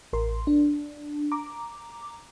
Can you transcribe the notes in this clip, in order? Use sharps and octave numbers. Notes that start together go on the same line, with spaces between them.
A1 A#4 C6
D4
A#5 D6